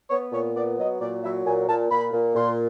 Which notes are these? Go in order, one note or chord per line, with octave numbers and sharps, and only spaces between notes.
B3 C#5
A#2 C#5
B3 D5
F#3 D#5
A#2 D5
F#3 E5
A#2 G#5
A#2 A5
A#2 B5
A#2
A#2 C6